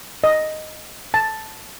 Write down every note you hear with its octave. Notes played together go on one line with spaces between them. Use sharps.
D#5
A5